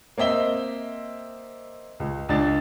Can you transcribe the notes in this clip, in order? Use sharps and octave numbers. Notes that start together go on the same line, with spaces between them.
A#3 C4 D#5 E5 G7
C#2
C#2 D4 A6